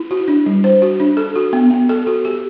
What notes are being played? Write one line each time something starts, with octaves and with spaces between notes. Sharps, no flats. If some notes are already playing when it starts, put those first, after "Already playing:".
Already playing: E4
F#4
D4
G3
C5
F#4
D4
A4
F#4
B3
B3
A4
F#4
G4